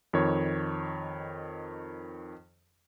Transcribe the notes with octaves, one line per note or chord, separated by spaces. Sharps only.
F2 D#3 C#5